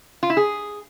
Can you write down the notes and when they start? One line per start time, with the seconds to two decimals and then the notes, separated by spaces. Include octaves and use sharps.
0.23 F4
0.30 E4
0.37 G#4